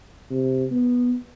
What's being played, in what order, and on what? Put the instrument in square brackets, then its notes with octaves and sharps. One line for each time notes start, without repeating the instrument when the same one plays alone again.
[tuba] C3
B3